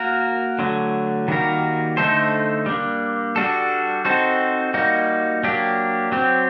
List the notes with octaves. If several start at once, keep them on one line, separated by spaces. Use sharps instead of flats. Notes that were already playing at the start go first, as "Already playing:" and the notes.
Already playing: A#3 F#4 A#4
D3 F#3 A3
D#3 G3 A#3 F#4 A#4
D3 A3 D#4 A4 C5
G3 A#3 D4
G3 D4 F#4 A4
C4 D#4 F#4 A4 C5
G3 A#3 D#4 F#4
F#3 A#3 D4 G4
F#3 C4 G4